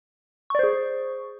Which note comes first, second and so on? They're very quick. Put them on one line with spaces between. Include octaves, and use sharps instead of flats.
C#6 D5 C5 G#4